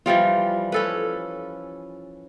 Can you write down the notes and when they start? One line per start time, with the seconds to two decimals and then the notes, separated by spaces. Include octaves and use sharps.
0.06 E3 F3 G3 F4
0.72 C#4 A4 B4